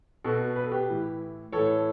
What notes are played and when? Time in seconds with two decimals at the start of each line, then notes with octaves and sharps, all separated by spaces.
0.24 B2 F#4 A4
0.56 B4
0.64 A4
0.71 G4 B4
0.89 A2 E3
1.52 A2 E3 A4 C#5